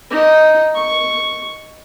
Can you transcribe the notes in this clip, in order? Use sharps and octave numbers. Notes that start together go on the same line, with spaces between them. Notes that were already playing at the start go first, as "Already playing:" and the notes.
D#4
C#6